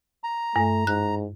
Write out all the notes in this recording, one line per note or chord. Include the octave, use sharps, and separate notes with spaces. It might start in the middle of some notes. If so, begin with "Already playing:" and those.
A#5
G2 A3
G#2 F#6